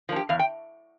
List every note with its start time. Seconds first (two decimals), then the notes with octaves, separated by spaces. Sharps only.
0.09 F3 A#3 D4
0.16 G4
0.29 E2 F5
0.39 G5